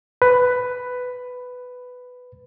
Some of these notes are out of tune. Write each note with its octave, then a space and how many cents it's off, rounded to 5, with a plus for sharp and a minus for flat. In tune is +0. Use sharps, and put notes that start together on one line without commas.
B4 +10